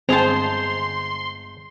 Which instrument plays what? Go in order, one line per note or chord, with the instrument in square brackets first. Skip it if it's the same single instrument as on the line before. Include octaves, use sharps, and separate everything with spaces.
[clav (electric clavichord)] G1 G#3 G#4 [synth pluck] C4 A5 [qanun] C5 A#5 [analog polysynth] C6